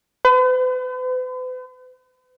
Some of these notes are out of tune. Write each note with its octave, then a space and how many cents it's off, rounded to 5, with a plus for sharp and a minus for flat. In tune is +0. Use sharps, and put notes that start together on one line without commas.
B4 +45